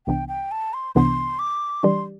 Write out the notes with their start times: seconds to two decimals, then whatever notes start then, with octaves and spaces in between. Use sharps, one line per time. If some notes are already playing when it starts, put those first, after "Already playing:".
0.07 C2 C3 E3 B3 D4 G5
0.28 G5
0.51 A5
0.74 C6
0.95 C2 C3 E3 B3 D4 C6
1.39 D6
1.83 E3 G3 D4 G4 D5 C6